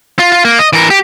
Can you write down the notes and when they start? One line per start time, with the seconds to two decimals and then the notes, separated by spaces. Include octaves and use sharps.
0.19 F4
0.32 F4
0.45 A#3
0.59 D#5
0.73 E3 A#4
0.90 G4